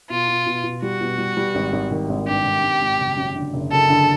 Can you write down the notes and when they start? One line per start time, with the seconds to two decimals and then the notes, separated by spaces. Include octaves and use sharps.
0.10 B2 F4
0.28 B2
0.46 B2
0.64 B2
0.82 G3 F#4
1.01 B2
1.18 G3
1.37 G3
1.55 G#1
1.73 G#1
1.91 D#3
2.09 G#1
2.27 G2 G4
2.45 G#1
2.63 G#1
2.81 G#1
3.00 F#1
3.17 F#2
3.36 D3
3.54 F#1
3.71 F#1 A4
3.90 D3